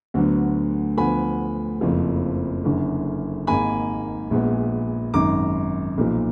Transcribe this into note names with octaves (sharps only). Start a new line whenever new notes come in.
D2 D3 F#3 B3
D2 D3 F3 B3 G#5 B5
F#1 F2 F3
F#1 F#2 D3
G#1 G#2 D#3 A#3 G#5 B5
A#1 A#2 G#3 B3
G#1 F#2 D#3 A#5 D6
B1 A#2 F3